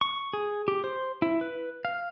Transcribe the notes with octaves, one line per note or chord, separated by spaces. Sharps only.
C#6
G#4
G4
C5
E4
B4
F5